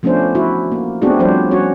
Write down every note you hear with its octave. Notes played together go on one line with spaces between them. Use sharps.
F3 A3 B3 C#4 D4 C5
E4 F#4
A#3
A3 B3 C4 D4 F#4 G#4
F3 G3 D4 C5 C#5
C#4 F#4 C#5